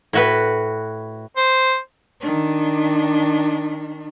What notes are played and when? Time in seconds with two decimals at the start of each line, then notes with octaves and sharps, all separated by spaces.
0.13 A2 F#4 B4
1.37 C5
2.21 D#3 D4